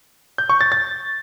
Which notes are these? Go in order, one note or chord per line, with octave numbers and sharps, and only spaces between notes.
G6
C#6
A6
A6